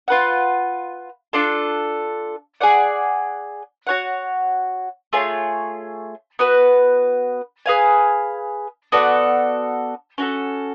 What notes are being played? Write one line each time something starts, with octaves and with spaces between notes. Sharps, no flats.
F4 B4 F#5
D4 F4 A4
G#4 D5 F#5
F#4 C#5 F#5
A3 F4 G#4 C#5
B3 F#4 B4
G#4 B4 F5 G#5
B3 F#4 A4 D5
C#4 F#4 A4